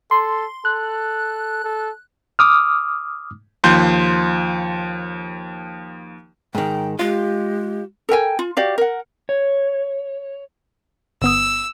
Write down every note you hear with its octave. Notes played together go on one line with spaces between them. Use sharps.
A4 C6
A4 F#6
A4
D6 D#6 F6
D#2 F3 C6 G6
G#2 D#3 G5
G#3 F4 G4
A4 A#4 G5 G#5
F4
F#4 G4 D5 F5
A#4 F#5
C#5
G1 B3 D#6 E6